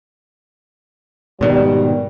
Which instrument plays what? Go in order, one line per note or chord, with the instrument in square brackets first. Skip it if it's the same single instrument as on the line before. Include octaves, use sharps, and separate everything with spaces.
[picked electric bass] G#2 B2 D#3 [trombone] G3